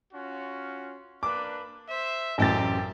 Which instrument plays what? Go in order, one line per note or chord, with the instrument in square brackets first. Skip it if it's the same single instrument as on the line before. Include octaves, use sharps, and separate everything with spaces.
[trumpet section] C#4 F4 F#4
[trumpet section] A#3 D4 B4 [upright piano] D6
[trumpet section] C5 E5
[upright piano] A1 F#2 A6 [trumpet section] A#3 C4 G4